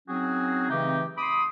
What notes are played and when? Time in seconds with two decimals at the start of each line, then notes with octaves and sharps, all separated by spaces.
0.08 F#3 C4 C#4 D#4 F#4 G#4
0.70 C#3 E3 A3 C4 D#4 G4
1.18 B5 C6 D6 D#6